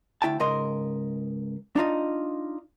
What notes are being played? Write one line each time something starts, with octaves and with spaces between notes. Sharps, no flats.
D2 E4 G5 A5
C#2 G#2 A#4 D#5 C6
D4 D#4 F4 D#5